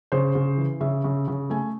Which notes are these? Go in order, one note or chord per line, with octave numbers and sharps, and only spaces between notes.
C#3 C5
C#3
E3
C#3 E5
C#3
C#3
A3 G#5